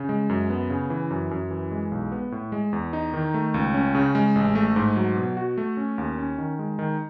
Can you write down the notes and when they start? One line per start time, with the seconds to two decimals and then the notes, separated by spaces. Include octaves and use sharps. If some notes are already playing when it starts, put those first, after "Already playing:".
Already playing: C#3
0.09 G#3
0.29 F#2
0.50 B3
0.70 C#3
0.90 E3
1.10 F#2
1.31 F#2
1.51 E3
1.71 G#3
1.92 B1
2.12 B3
2.32 A2
2.52 G#3
2.73 E2
2.93 D#4
3.13 D#3
3.34 A3
3.54 C#2
3.74 C#4
3.95 C#3
4.15 G#3
4.35 A1
4.55 A3
4.76 G#2
4.96 F#3
5.16 B2
5.37 F#4
5.57 A3
5.77 C#4
5.98 D#2
6.18 C#4
6.38 D#3
6.59 G#3
6.79 D#3